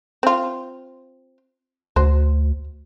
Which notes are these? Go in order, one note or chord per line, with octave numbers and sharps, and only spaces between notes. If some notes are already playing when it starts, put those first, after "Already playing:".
C4 F4
D2 F#4 C5